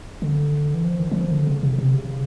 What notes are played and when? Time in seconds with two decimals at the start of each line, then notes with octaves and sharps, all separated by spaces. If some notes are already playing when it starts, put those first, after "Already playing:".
0.22 D3
0.74 E3
0.84 F3
1.00 D#3
1.11 F#3
1.15 F3
1.31 D3
1.47 C#3
1.63 C3
1.78 C3
1.94 C#3